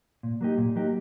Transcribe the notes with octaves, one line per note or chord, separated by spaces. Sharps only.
A#2
F#3 A#3 D#4 G4
A#2
F#3 A#3 D#4 G4